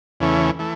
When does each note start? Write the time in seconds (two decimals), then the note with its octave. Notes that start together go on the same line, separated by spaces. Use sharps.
0.20 E2 C#3 E3 A3 C#4
0.59 E3 A3